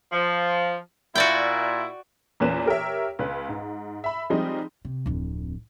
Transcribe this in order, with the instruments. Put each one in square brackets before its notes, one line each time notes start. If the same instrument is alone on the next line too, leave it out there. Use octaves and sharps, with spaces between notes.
[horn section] F3
[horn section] A#2 E4 [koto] F#4 D5 G5
[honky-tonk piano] E2 A#2 A#3 C#4 B4 E7
G4 A#4 C#5 E5
C#2 B4
G#2
E5 B5
F3 G3 G#3 C4 D#4
[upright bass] C3
D1 F2